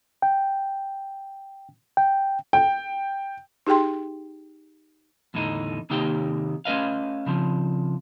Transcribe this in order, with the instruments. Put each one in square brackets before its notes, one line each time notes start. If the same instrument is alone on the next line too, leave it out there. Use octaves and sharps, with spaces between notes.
[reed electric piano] G5
G5
[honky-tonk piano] G5
[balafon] D#4 G4 G#4 G5 C6
[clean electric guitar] E2 A2 D3 D#4
C3 D#3 A#3 D#4 G4 G5
A3 C#4 B4 D#5 F5
C#3 F3 C4